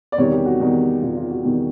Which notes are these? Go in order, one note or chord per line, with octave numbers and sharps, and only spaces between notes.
D5
E2 C3 D#3 G3 C#5
G4
F#4
E2 C3 D#3 G3
E2 C3 D#3 G3 F4
F4
F#4
E2 C3 D#3 G3